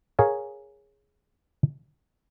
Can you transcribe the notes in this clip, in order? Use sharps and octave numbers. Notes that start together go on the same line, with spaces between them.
G#4 A#4 C#5 F5